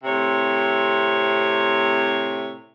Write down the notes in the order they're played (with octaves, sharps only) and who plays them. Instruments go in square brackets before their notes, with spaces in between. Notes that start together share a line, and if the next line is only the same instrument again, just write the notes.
[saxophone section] A2 C3 C4 C#5